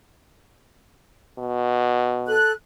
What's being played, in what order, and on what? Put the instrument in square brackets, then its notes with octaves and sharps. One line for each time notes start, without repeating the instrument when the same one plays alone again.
[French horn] B2
[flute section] A4 F#6